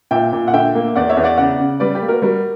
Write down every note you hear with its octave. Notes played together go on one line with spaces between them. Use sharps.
A#2 E5 G5
A#2
F#5
D3 E5 G5
A#3
E2 D5 F#5
C#5 E5
E2
D5 F#5
C#3 D5 F#5
C#3
G3 B4 D5
G4 B4
A#3
F#4 A#4
G3 F#4 A#4